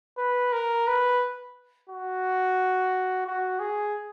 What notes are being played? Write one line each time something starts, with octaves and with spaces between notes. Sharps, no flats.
B4
A#4
B4
F#4
F#4
G#4